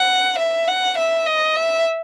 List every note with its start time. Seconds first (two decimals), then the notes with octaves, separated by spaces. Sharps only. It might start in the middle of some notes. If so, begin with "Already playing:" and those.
Already playing: F#5
0.38 E5
0.68 F#5
0.98 E5
1.26 D#5
1.56 E5